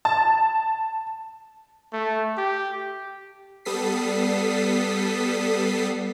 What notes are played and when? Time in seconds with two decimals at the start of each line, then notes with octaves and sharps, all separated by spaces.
0.05 A5
1.93 A3
2.37 G4
3.65 G3 B3 A4 D#6 B6 C7